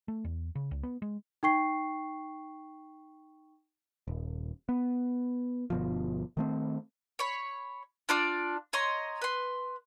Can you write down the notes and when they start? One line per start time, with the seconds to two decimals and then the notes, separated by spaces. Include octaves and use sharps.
0.08 A3
0.25 E2
0.55 C#3
0.71 C#2
0.83 B3
1.02 G#3
1.43 D#4 G5 C#6 C7
4.08 D#1
4.69 B3
5.70 G1 B2 F3
6.37 D#3 A3 C4
7.19 C#5 B5
8.09 D4 F4 D5
8.73 C#5 D#5 A#5 C6
9.22 B4 C6